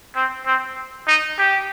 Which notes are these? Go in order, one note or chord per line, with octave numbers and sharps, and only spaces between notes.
C4
C4
D#4
G4